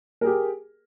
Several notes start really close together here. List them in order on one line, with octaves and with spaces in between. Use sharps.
A#4 G#4 G4